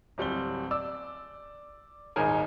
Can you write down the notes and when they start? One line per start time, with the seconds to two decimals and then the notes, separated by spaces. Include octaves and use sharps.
0.18 D1 G3 C4 G7
0.71 D5 D6 E6
2.16 D#1 G#1 D#4 G#4 A#4 G#5